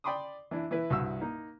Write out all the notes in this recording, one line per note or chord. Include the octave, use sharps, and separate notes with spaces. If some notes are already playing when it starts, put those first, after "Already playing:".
D5 G5 B5 C6 D6 D#6
E3 D4 E4
E3 E4 B4
C2 G2 F#4 E5 E6
A#3 D#4